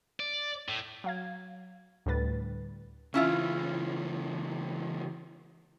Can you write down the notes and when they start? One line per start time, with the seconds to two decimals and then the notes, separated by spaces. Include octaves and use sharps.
0.20 D5
0.69 A2
1.04 F#3 F5 G#6
2.06 D2 A2 G3 B4 A6
3.14 C#2 E3 C#4 E4 F4